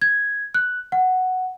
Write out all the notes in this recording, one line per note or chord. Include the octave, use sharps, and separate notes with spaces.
G#6
F#6
F#5